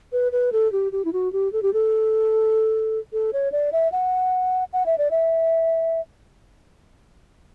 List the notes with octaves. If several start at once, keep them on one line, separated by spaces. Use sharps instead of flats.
B4
B4
A4
G4
G4
E4
F#4
G4
A4
G4
A4
A4
C#5
D5
E5
F#5
F#5
E5
D5
E5